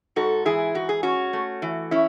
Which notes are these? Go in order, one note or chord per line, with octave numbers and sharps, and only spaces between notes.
G#2 F#4 A4
E3 E4 G#4
G#2 F#4
G#4
C#4 F#4
A3
E3
C#4 E4